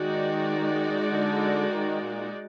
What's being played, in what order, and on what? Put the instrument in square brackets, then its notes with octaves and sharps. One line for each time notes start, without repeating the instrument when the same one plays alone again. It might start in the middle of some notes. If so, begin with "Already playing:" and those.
Already playing: [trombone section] D#3 [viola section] G#3 D#4 F#4 D5
[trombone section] D3
D#3
A#2